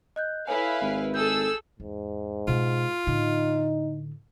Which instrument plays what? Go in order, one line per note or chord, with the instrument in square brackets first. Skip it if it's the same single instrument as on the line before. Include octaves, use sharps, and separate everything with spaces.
[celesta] D#5 F#6 G6
[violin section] E4 B4 F5 [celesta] A4 C#5 G#5
[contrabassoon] G#1
[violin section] G#4 A4 E6 [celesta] G6
[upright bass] E2 [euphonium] G#2
[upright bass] B2 G#3 [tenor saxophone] F4
[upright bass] A2 D3 [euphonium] D#4